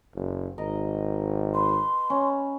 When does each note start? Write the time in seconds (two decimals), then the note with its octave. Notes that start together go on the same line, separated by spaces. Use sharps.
0.14 F#1
0.58 G#1 A#4 D#5
1.54 B4 C6
2.10 C#4